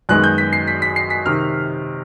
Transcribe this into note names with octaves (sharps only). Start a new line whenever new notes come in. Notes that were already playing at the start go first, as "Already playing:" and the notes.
F#2 D#3 G#3 B3 F#6
G6
B6
C7
B6
B6
C7
B6
C3 D#3 F6